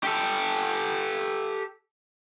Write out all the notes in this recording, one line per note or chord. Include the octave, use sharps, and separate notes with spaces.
G4 A4